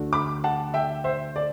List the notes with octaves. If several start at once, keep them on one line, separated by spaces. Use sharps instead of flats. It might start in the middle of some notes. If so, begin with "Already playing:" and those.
Already playing: D2 D3 A3 D4 F#4
B5 D6
F#5 A5
E5 G5
C5 E5
D5